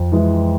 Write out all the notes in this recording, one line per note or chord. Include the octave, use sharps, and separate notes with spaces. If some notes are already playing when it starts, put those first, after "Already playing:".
Already playing: F2
E3 G#3